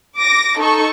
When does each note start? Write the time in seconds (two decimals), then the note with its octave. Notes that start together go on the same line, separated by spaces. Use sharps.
0.17 D6 A#6
0.58 D#4 A4 C#6